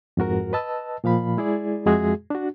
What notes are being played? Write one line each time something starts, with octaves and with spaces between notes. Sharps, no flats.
F2 G#2 F#4 A#4
B4 D#5 A5 E6
A#2 F3 F5 B5
G#3 E4 G#4 D5
F2 G#3 F#4 G#4 E5
D4 F#4